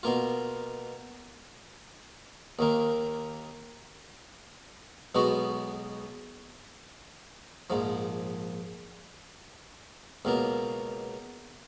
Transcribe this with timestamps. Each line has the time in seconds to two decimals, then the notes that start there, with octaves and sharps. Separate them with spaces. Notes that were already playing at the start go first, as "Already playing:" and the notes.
0.03 B2 A#3 F4
2.59 D#2 D#3 A#3
5.15 B1 B2 G#3 B3 F#4
7.70 A#1 G#2 F3
10.25 C#2 B2 A#3